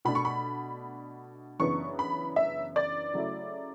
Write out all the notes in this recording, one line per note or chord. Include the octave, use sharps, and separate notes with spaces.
B2 A3 D4 B5
C#6
B5
F#2 C#3 E3 B3 D4 C#6
B5
E5
D5
C#3 F#3 A3 E4